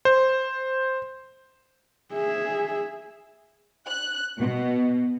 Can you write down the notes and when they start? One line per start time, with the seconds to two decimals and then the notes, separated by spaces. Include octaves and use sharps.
0.05 C5
2.13 G#4 E5
3.87 F#6
4.39 B2